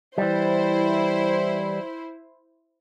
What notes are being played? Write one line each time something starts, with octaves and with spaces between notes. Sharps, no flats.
E3 G3 E4 C5